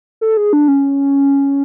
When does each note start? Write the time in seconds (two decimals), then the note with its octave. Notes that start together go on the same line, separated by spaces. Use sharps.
0.21 A4
0.37 G#4
0.53 D4
0.68 C#4